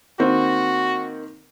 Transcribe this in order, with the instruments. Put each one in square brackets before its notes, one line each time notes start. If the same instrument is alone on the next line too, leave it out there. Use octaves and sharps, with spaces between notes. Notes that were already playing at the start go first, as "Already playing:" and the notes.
[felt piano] D#3 A#3 C4 [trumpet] F#4